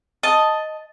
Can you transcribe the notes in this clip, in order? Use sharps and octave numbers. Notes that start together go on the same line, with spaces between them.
D#5 A5